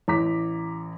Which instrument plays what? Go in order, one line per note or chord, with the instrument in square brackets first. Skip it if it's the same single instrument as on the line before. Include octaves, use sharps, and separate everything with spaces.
[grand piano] A1 A#5 D6 B6